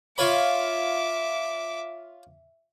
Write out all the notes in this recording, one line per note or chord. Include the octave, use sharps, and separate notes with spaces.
F4 C#5 E5 B5 D6